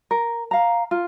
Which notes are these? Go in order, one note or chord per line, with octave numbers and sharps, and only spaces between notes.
A#4
F5 A#5
F4